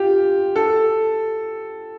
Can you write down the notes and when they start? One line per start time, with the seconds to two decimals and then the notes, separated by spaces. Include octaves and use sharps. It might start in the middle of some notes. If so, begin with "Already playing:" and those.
Already playing: F4 G4
0.56 A4